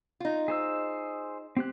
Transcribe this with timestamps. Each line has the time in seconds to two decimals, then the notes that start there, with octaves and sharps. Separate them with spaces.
0.20 D#4 F4
0.48 G#4 C5 E6
1.57 C4 G4 F#6